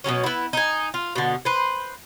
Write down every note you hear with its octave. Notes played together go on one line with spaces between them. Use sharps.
B2 D3 F#3 C#4
B3 E4
D#4 G#5
F4
B2 D3
B4 C5